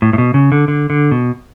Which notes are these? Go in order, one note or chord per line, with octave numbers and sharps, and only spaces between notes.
A2
A2
B2
C#3
D3
D3
D3
B2